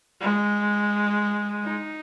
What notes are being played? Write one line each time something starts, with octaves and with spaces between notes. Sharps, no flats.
G#3
D#4